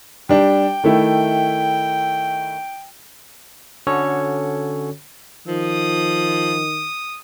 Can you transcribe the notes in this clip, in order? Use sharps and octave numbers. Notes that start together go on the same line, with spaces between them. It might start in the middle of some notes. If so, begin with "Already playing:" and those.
G3 D4 G5
D#3 A3 E4
D3 C#4 F#4 A4 C#5
D#3 F3 D#6